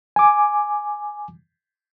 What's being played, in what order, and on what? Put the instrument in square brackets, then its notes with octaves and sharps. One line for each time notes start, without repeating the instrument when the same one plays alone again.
[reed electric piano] G#5 D6